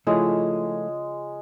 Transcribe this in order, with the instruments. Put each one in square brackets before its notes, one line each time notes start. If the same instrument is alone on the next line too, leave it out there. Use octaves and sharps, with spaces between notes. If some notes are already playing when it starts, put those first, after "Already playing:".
[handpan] C#3 F4 C#5 [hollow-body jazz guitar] F3 A3 E4 [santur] G#3